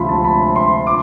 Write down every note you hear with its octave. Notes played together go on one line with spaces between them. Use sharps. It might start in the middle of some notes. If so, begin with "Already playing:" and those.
Already playing: D2 C3 F3 B5 C6
A5
B5
C6
D6